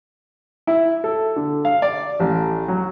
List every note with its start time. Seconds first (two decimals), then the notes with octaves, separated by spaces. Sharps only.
0.67 E4
1.04 A4
1.36 D3
1.65 F5
1.82 D5
2.20 A1
2.68 F#3